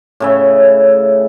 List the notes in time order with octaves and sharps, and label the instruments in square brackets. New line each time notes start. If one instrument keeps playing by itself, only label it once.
[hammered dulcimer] A2 C#3 E5